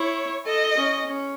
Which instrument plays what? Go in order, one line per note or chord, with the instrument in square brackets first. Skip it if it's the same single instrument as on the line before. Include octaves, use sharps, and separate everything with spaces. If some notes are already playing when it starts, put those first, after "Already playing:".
Already playing: [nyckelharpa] E4 [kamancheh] C#5
[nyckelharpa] A4 [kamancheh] D#5
[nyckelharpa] C#4
C#4